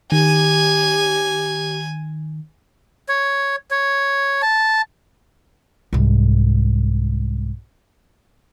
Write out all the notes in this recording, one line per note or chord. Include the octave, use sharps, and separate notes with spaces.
D#3 G4 G#5
C#5
C#5
A5
C2 G#2